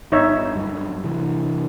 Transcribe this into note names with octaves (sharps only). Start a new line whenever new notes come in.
G1 D#4 C#5 E5
G2 F#3
C3 E3